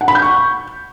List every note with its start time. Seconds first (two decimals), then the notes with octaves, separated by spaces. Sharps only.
0.01 F#5
0.08 B5
0.15 G6
0.22 C#6